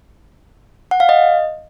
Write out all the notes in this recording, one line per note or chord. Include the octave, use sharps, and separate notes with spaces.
F#5
F5
D#5